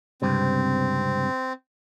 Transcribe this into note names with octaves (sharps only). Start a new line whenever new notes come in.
C#2 G2 C3 C4